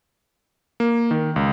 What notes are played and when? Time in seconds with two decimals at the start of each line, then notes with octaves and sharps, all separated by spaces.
0.80 A#3
1.11 D#3
1.36 C#2